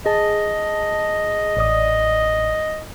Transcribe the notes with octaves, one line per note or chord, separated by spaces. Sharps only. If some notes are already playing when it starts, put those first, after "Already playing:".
G#4 D#5 A5
A1 D5 D#6